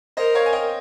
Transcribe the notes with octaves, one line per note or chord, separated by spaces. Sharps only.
A#4 C5 D#5
C#5 F5
G#5
D#5 G5